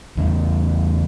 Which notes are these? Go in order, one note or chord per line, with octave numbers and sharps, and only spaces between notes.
E2 C#3